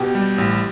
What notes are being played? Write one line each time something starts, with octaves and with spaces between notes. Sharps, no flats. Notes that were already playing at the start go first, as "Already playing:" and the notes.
Already playing: B2 G4
G3
A1